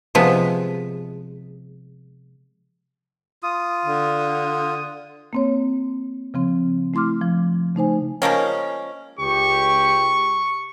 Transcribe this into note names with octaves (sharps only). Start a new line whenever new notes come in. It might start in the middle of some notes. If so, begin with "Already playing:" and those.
C3 F3 G#3 B3
F4 D#6
D3
A#3 C4 C#5
C#3 F3 C4
A3 E4 C6 D6 F6
F3
C#3 A3 D#4 C5 G#5
F3 G#3 A#3 C#4
C#2 G4 C#6